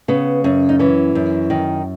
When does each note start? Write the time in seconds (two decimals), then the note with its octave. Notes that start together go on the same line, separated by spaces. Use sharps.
0.08 C#3 B3
0.44 F#2 C#4
0.69 D#4
0.79 E3 C#4
1.15 F#2
1.50 D#3